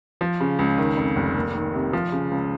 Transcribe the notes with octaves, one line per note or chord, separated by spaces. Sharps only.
F3
C#3
C#2
D#3
F2
F1
A#3
D#3
C3
F3
C#3
C#2